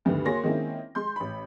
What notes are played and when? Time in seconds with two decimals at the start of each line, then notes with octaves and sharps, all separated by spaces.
0.05 D2 G2 D3 D#3 B3
0.25 A#3 F#4 G#4 C#5 C6 A#6
0.43 D#3 G#3 A#3 C4 C#4 E4
0.95 G#3 C6 G6
1.16 A1 B5